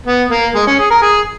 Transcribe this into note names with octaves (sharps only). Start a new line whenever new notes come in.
B3
A#3
G#3
C#4
G#4
A#4
G#4